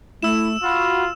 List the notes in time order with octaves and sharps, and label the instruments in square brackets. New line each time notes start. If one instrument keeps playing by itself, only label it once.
[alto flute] A3 [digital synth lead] E4 [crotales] E6 E7
[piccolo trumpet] F4 [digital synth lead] F#4 [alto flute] B5